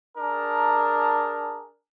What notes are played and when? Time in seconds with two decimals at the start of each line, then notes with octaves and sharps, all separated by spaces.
0.18 D4 G#4 A#4 A5 A#5